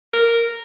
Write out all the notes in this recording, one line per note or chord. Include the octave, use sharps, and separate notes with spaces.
A#4